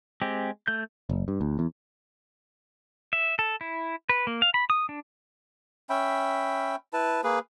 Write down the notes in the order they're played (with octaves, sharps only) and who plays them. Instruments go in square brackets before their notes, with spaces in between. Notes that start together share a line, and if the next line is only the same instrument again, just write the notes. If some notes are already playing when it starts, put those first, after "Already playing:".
[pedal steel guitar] G#3 C4 G4
A3 G6
[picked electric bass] F#1
G2
D2
E2
[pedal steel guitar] E5
A4
E4
B4
A#3
F5
B5
D#6
D4
[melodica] C#4 E5 G5 B5
E4 B4 A5
A#3 G#4 B4